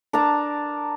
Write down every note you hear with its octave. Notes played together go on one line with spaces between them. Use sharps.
D4 A#4 A5 A#5